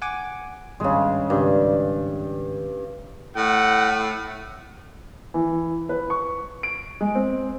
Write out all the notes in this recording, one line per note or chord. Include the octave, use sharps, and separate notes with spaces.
F#5 G#5 D6
G#1 G2 C#3 G#3
G#1 C#2 G2
A2 F#5
E3
B4
C#6
D7
G#3
C4